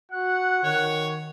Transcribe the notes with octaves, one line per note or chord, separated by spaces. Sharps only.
F#4 F#5 F#6
D#3 C#5